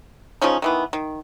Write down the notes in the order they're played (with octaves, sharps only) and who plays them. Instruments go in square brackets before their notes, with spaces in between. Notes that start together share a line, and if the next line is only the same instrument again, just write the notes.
[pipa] C#3 F3 C#4 D#4
D#3 E3 B3
D#3